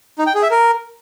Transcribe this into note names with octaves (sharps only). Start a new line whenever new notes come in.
D#4
G5
G#4
E5
A#4